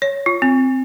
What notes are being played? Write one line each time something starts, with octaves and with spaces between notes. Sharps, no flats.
C#5
F4
C4